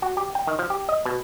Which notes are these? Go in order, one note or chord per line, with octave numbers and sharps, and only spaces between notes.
F#4
G4
G5
D#3
F3
G4
D#5
B2